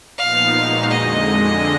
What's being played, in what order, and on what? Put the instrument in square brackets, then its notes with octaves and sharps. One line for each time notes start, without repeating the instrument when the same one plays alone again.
[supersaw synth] A#2 F3 B3 D#4 [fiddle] F5
[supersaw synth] A#2 G#3 D#4 F#4
[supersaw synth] F2 D3 G#3 [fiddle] D#5